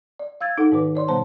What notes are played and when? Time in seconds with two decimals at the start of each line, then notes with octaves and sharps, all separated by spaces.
0.19 D5
0.41 F5 E6 G#6 A6
0.58 D#4 A4 F#5
0.72 G#2 D#3 B4 D6
0.95 C#5 D5 C6
1.08 B2 G3 B3 C5 A5